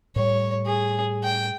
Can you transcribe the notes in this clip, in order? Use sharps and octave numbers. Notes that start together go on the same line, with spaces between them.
A2 G3 C#5
G#4
G5